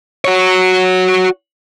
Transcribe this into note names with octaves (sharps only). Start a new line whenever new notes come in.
F#4 C#5